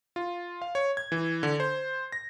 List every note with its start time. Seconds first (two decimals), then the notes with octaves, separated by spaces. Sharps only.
0.16 F4
0.62 F5
0.75 C#5
0.97 G#6
1.12 E3
1.43 D3
1.60 C5
2.12 A#6